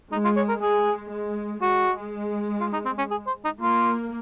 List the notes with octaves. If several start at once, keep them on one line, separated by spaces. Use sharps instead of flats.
G#3 D#4
F4
C#5
A#4
G#3 G#4
G#3
G#3 F#4
F4
D#4
C4
C#4
G#4
C5
D#4
A#3 F4